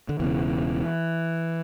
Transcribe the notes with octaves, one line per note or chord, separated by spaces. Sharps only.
D3
E1 E2 C#3 E3